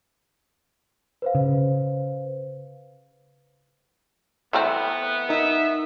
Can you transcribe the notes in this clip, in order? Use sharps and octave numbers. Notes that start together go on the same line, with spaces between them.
B4 C5 F5
C#3
E3 A3 B3 C4
D#4 A#4 E5